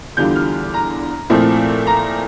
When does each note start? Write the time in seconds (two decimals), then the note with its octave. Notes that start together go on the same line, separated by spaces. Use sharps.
0.17 E2 D3 G3 D4 F4 G6
0.35 F6
0.74 A#5
1.30 A#2 F3 A3 C4 E4
1.87 A#5